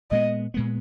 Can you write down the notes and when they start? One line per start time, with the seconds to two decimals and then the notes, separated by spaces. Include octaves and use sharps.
0.11 A#2 G#3 B3 D#5
0.54 A#2 G#3 B3